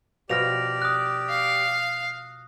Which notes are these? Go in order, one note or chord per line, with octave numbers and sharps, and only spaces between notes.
B2 F3 G4 D5 F6 A#6 F7
D#6 F#6
F5